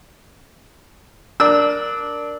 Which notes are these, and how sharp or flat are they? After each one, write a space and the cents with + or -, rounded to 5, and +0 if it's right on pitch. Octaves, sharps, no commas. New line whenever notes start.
D4 +0 A#4 +0 E6 -30